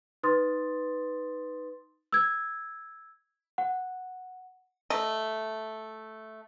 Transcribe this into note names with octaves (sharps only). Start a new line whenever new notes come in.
D#4 B4 C6 D#6 A6
E6 G#6
F#5
A3 D#5